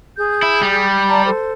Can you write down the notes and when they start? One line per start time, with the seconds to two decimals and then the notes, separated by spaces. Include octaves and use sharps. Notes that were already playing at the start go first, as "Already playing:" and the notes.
0.18 G#4 G6
0.42 E4
0.62 G3
1.09 D5 A5 A#5
1.26 A4 C5